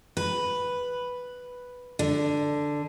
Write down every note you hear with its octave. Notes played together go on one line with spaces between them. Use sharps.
B4
D3